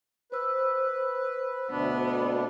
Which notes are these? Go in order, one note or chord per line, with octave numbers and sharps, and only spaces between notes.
B4 C5 E6
D2 B2 B3 D4